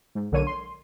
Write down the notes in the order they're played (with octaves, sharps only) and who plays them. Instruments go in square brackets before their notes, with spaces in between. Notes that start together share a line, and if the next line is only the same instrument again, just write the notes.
[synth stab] G#2
B1 D3 A#3 C#5 D#7
C6